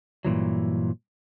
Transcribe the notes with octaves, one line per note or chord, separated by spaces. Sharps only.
G2 A#2 E3 F#3